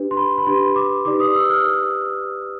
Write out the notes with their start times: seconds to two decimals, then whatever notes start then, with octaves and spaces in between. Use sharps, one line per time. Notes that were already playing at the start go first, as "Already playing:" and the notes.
Already playing: D4 G4 B4
0.11 C6
0.17 B5
0.38 B5
0.46 D4 G4 B4 C6
0.76 D6
1.05 D#4 G4 B4 D5 D6
1.20 D#6
1.35 E6
1.50 F6